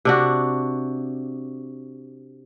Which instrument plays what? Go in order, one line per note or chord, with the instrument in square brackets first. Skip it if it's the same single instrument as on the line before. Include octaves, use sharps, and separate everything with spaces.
[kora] C3 D4 F#4